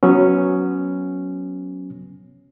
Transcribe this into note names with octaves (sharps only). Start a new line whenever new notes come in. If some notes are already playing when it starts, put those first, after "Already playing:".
F#3 B3 C#4